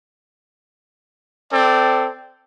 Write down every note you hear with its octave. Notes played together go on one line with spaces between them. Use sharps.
C4 A4 D5